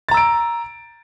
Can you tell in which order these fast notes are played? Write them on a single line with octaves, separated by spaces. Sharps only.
A6 A#5 E6 D7